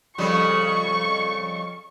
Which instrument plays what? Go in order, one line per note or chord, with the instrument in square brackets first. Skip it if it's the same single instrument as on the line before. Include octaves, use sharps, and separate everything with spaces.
[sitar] F2 C#3 G3 [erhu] C#6